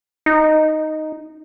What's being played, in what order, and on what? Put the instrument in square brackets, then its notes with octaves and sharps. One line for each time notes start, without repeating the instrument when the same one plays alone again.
[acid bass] D#4